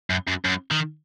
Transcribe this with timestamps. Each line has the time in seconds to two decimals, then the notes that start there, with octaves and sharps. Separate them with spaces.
0.10 F#2
0.28 F#2
0.45 F#2
0.71 D#3